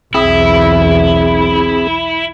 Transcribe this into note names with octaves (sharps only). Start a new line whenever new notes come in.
B1 E2 C4 E4 G#4